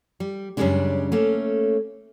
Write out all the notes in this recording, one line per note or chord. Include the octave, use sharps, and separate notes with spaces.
G3
F#2 C#3 E3 G3 G#3 D4
A3 A#3 C#4